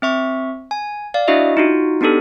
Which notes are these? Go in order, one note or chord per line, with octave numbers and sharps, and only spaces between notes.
C4 E5 C#6
G#5
D5 F5
D4 E4 F#4 D#5 E5
D#4 F4 F#4
B3 D4 D#4 G4 A4